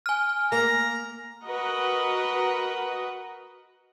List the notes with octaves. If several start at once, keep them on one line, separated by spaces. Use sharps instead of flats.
G#5 F6
A#3 A#5
F#4 A#4 B4 D#5 F#5